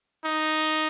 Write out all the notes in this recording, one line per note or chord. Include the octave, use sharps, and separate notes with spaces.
D#4